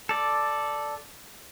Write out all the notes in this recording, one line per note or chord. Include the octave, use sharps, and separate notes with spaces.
A4 D5